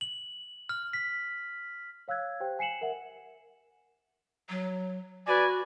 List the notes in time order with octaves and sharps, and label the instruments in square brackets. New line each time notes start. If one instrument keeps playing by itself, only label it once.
[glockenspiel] F#7
F6
B6
[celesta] C#5 F5 E6 F#6 G#6
G4 C5 G5
G#5 C7 C#7 E7 F#7
A#4 E5 F#5
[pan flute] F#3
[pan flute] F#4 [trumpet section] B4 D5 G#5